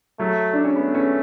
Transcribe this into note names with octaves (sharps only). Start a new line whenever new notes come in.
F#3 A3
D4
C#4
A3 B3
C#4